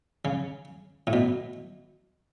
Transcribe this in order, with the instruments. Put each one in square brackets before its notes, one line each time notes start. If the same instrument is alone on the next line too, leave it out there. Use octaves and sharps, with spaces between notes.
[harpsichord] C#3
A2
B2